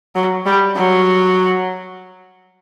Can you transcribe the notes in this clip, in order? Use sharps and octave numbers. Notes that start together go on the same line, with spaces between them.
F#3
G3
F#3